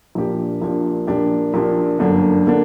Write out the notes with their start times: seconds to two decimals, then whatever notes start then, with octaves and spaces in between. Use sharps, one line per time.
0.15 A#1 A#2 A#3 D4 G4
0.62 A#1 A#2 A#3 D4 G4
1.07 A#1 A#2 A#3 D4 G4
1.54 A#1 A#2 A#3 D4 G4
1.99 G1 F#2 D3 A#3 D4
2.47 D3 A#3 D4